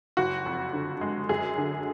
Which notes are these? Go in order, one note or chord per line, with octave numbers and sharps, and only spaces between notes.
F#1 F#4
F2
D3
G#3
F#2 G#4
D3